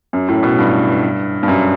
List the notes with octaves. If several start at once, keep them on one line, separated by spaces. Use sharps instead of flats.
F#2
A2
B2
G2
G2
F#2